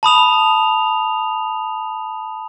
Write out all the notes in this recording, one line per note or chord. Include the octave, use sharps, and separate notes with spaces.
A5 B5 D#6 F7